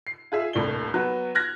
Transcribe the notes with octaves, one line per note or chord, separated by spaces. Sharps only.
C7
F4 G#4 E5
D#1 C2 A2 D4 G7
F#3 B3
F6 F#6 G#6 A#6